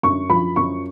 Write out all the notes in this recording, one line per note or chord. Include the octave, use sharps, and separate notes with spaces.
F#2 C#6
F3 B5
F#2 C#6